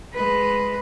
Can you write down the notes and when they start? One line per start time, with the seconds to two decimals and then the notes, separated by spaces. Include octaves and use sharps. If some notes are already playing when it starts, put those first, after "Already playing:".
0.14 G#3 B4